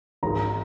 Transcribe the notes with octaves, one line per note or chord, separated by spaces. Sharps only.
G#1 G#2 D#3 G#3 A#5